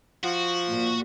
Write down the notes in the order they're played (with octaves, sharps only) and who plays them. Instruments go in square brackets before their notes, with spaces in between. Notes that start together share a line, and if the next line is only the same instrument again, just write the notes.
[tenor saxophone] F3 [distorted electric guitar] F#4
[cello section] A#2